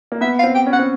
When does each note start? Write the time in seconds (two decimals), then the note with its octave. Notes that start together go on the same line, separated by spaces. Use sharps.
0.12 A#3
0.21 B3 E5
0.39 F5
0.44 C4
0.55 G5
0.66 C#4
0.73 F#5
0.79 C4